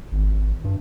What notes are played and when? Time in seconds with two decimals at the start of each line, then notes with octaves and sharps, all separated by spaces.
0.12 G#1
0.64 G2